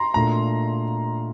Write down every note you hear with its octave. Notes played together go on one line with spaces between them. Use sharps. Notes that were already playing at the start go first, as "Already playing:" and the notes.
Already playing: A#5 C6
A#2 A3 D4 A#5